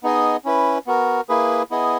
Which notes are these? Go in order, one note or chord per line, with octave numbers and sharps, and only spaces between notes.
B3 D#4 G#4 D#5
C#4 E4 B4
B3 F#4 A#4
A#3 E4 G#4 B4
B3 E4 G#4 D#5